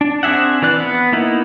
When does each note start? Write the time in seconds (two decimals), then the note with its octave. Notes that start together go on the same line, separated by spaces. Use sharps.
0.01 D4
0.23 C4 D4 G#4 E5 F#5
0.62 E3 B4 D5 F#6
0.80 B3
1.13 A#3 B3 D#4 E4